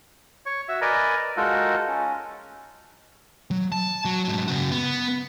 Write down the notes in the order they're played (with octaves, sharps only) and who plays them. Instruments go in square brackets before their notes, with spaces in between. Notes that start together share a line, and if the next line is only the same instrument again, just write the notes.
[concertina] C#5 C#6
F#4 E5
A#4 B4 D5 D#5 G#5 A#5
G#3 D#4 F4 F#4 A4 A#4
C#4
[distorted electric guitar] F#3
A5
F#3
G#2 F#3
C#3 F#4
B3